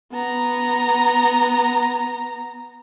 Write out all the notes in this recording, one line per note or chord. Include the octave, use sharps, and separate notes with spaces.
B3 A#5